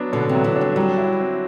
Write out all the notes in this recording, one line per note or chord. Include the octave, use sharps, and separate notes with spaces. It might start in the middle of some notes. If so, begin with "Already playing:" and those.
Already playing: F#3 B3 D4
B2 D3
C3
F#3
E3
D4
G3
F#3 G3
E4
C4